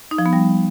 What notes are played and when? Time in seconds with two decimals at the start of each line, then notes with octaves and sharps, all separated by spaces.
0.11 D#4
0.18 F3
0.26 B3
0.33 G3